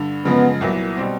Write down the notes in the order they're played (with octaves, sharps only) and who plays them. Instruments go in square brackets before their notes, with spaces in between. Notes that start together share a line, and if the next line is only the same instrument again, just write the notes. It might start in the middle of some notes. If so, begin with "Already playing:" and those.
Already playing: [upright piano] G2 D3
[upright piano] F#2 C#3 F3 G#3 [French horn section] B3
[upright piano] C2 A#2 F#3 B3 E4
B2 G3 C4